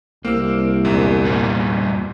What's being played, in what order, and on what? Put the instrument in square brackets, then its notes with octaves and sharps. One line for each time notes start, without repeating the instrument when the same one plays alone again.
[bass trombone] C2 [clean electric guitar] A#3 [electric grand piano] C4 E6
[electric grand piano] A#1 E2 G#2
[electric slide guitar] G2 A#2 G3